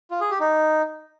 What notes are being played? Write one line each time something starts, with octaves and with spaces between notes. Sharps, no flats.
F4
G#4
G4
D#4